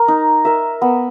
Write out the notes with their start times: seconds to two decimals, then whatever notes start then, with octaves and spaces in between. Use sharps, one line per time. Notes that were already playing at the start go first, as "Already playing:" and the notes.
Already playing: A#4
0.08 D#4
0.45 A#4 E5
0.82 B3